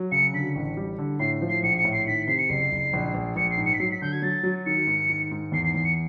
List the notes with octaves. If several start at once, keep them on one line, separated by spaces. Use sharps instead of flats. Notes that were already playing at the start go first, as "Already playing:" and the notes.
Already playing: F#3
C#3 C#7
D3 B6
A1
G3
D3
A2 C7
F3
C7
A#1 C#7
C#7
A2
C7
D#3 B6
C3 C7
C#7
F#1 C7
F#1
A#1
A#1
A#1 C#7
C7
G#2
C#7
B6
F#3 C7
B6
D3 G6
G#6
F#3 A6
F#3
D#3 C#7
G#2
D#3
G#2
E2 C7
C7
E2 C7
C#7